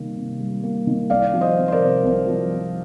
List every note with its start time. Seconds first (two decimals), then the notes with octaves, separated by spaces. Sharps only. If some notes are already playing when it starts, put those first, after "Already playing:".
Already playing: C3 D#3 G3 A#3
0.16 C3
0.40 G3
0.64 A#3
0.87 D#3
1.10 C2 D5 F5
1.33 F3
1.41 C5 D#5
1.57 C4
1.68 C5
1.72 A#4 D5
1.80 C3
2.04 C2
2.27 F3
2.50 C4